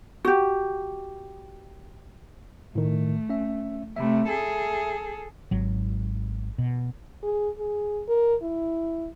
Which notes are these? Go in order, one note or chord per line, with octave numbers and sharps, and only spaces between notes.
F#4 G4
A2 D#3 A3
C#4 E5
C3 A3 E5 B5
G#4 A4
G#1 F#3
B2
G#4
G#4
A#4
E4